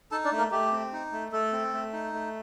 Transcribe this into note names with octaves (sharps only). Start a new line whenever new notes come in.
D#4 A4 A5
D4 D5
A3
A#3 A#4
A3 G4
C4
D#4
A3
A3 A4
C4
A3
D#4
A3